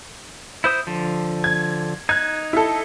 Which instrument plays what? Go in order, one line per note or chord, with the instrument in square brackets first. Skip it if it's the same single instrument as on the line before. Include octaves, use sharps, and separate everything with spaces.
[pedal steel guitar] E4 C5 D#6
D3 F3
[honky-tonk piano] G#6
[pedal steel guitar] D#4 F#6 [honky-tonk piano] G#6
[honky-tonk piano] E4 A4